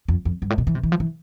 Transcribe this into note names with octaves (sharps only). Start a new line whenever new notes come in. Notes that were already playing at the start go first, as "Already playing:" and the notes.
F2
F2
G2
A2
B2
E3
C3
E3
F3
E3